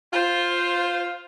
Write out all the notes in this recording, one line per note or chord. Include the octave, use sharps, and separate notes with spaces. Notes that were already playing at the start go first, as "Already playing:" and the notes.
F4 C5